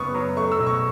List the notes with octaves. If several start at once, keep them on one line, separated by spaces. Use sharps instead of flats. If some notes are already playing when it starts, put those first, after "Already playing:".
Already playing: F#2 C#3 B3 C#6 D#6
F#3
A3 C#6
E6
B2
C#6